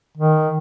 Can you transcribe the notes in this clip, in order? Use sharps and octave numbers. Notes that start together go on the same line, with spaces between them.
D#3